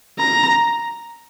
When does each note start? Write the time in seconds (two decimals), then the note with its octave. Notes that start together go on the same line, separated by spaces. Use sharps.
0.19 A#5